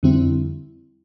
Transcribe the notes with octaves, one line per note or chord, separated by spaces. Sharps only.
F2 D3 G3 C4 E4